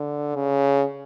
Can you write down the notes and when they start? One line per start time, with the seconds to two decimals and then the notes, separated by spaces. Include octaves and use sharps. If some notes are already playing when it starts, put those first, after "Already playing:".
Already playing: D3
0.36 C#3